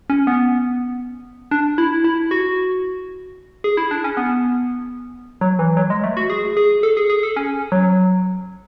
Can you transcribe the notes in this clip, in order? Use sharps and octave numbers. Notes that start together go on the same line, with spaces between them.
C#4
B3
D4
E4
E4
F#4
G#4
E4
D4
C#4
B3
F#3
E3
F#3
G#3
A3
F#4
G#4
G#4
A4
G#4
G#4
A4
C#4
F#3